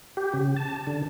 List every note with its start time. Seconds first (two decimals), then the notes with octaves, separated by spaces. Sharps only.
0.17 G4
0.34 C#3
0.56 A5
0.87 D3